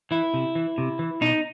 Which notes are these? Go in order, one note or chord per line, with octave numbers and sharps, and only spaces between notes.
E3 E4
C3
E3
C3
E3
B2 D#4